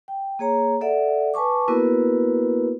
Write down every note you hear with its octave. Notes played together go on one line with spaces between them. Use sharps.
G5
A#3 G#4 C#5 A#5
A4 D5 E5 F#5
B4 G#5 A5 C#6 D6
A#3 B3 E4 F#4 A#4 B4